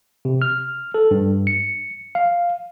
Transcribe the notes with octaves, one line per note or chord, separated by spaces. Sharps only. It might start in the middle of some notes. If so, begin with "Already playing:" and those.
C3
F6
A4
G2
C#7
F5